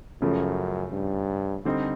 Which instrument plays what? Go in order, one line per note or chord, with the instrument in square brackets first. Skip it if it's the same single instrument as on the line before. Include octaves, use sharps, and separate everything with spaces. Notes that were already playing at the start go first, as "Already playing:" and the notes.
[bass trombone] F#2 [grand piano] C#3 F3 A3
[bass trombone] G2
[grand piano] D3 G3 C4 D#4